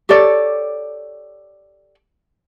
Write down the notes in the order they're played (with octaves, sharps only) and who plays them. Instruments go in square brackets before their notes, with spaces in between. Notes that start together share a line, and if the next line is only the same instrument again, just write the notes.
[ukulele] G4 A4 C#5 D5